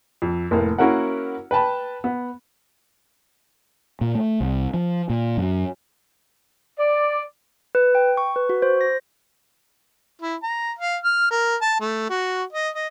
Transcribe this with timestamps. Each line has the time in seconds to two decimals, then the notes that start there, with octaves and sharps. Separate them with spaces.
0.22 F2
0.51 F1 A2 A#3
0.78 A#3 C#4 E4 F#4 A#4 F#5
1.51 B4 G5 A5 B5
2.04 B3
4.01 A#2
4.15 A3
4.40 C2
4.74 F3
5.10 A#2
5.37 F#2
6.79 D5
7.75 B4
7.95 G5
8.17 C#6
8.36 B4
8.49 F#4
8.62 C5
8.81 A#6
10.22 E4
10.43 A#5
10.79 F5
11.04 F6
11.31 A#4
11.62 A5
11.80 A3
12.10 F#4
12.53 D#5
12.74 D#5